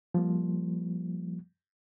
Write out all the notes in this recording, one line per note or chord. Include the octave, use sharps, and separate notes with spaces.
F3 G3 A#3